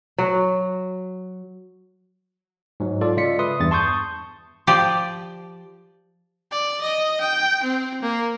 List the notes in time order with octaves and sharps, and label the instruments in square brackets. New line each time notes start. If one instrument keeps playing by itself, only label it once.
[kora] F#3
[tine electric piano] G#2 F#3
F4 A4 D5
C#3 G#3 F4 D5 B6 C#7
B4 E5 C6 D#6
E2 G2 A6
A5 C6 C#6 D#6 G6
[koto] F3 G4 D5
[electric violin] D5
D#5
G5
C4
A#3